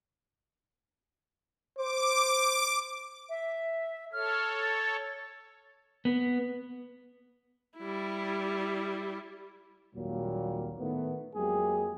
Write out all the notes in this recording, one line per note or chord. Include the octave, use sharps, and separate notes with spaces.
C5 D6
E5
A4 C#5 F6
A6
B3
G3 E4
G#1 D#2 A#2 F#3 G3 A#3
A2 D#3 A3 B3
F2 F#3 G#3 A#3 G4 G#4